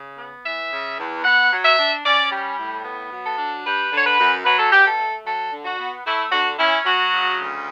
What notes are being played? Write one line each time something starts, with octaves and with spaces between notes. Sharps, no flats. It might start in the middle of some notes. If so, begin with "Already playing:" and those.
Already playing: C#3
B3
E3 E5
C#3
E2
B3 F#5
F#3
E5
D4
C#4 D5
G3
A2
B3
F#3
A4
D4
G3 B4
D3
C#5
B4
F#2
F#3 B4
A4
B2 G4
A4
A3
F#3 A4
D3
F#4
B3
A3 E4
D3 F#4
C#4 E4
F#3 F#4
C#3
D2